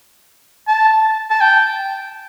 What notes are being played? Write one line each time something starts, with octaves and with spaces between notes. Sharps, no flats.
A5
A5
G5